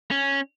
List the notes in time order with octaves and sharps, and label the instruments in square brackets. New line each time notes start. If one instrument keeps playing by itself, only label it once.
[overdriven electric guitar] C#4